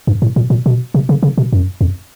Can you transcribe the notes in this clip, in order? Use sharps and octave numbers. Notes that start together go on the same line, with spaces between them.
G2
A2
A#2
A#2
B2
C3
C#3
C#3
B2
F#2
F2